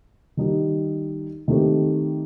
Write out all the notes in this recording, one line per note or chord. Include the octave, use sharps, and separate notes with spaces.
D#3 G3 D#4
D#3 A3 C4 D#4 G4